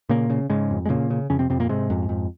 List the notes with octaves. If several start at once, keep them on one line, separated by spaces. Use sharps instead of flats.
A#2 C#3 A#3
C#3
G#2 C#3 G#3
F2
G#3
A#2 C#3 A#3
C#3
F2 C#3 C#4
C3 C4
F2 C3 C4
A#2 A#3
G#2 C3 G#3
F2
F2